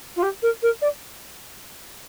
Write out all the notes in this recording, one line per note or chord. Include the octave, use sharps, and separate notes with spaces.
F4
G4
A#4
A#4
D5